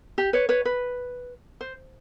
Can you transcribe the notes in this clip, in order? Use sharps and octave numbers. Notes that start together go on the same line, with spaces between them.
G4
B4 C#5
B4 C#5
B4
C5